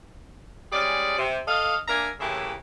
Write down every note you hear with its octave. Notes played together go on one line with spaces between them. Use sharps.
G3 G#3 C#4 G#4 D5
C3
A4 D#5 F5
A#3 D4 A#4 E5 G#5 A#5
A2 C#3 E3 A#3 G4 E5